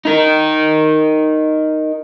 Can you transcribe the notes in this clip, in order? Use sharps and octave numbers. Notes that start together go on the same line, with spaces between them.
D#4 A#4